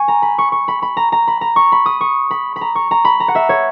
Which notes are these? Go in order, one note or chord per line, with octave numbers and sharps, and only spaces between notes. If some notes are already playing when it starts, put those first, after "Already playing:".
Already playing: G#5 C#6
A#5
B5
C#6
C#6
B5
B5
A#5
A#5
B5
A#5
C#6
B5
D#6
C#6
B5
B5
A#5
C#6
A#5
B5
A#5
F#5
E5
C#5